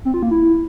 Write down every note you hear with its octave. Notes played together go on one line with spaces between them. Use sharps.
C4
F4
A#3
E4